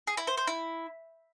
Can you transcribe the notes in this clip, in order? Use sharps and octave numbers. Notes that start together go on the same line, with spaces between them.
G#4
E4
C5
C5
E4